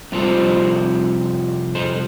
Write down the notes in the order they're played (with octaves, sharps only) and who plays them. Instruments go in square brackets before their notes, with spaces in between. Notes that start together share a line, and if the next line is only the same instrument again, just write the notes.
[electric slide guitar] F2 C3 G3 C4 F4 A4 C5
A4 C5